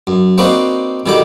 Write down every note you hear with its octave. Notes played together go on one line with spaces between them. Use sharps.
F#2
A#3 C4 D4 D#4 F#4 B4
B2 D3 D#3 G3 E4 D6